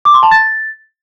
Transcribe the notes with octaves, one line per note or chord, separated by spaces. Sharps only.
D6
C6
A5
A6